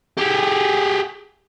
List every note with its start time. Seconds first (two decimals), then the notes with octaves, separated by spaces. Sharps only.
0.17 G4 G#4